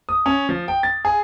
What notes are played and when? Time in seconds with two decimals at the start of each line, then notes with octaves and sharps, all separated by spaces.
0.09 D#6
0.26 C#4
0.49 F3
0.68 G5
0.83 A6
1.05 G#4